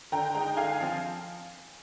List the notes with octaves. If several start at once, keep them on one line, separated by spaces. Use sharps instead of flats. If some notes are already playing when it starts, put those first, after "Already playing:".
D3 G5 A#5
G#3 D#4 G5 A#5
D3 F5 G#5
F3 C4